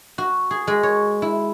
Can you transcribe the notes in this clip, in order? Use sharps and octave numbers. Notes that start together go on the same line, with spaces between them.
F#4
G#4
G#3
C#5
E4